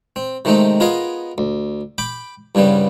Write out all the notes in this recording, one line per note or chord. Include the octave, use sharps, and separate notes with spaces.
C4
C3 D#3 G#3 A3 C4 D#4
B3 F4 G#4 A#4 D#5 F5
D2
G5 B5 D6
C2 G2 C#3 G3 B3